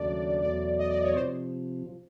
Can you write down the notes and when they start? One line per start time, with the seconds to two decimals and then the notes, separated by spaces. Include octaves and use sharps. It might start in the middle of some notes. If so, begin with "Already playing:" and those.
Already playing: D#2 C#3 F#3 A3 D4 D5
0.42 E2 B2 F#3 A3 D5
0.78 D#5
0.90 D5
1.03 C#5
1.15 C3 F3 C5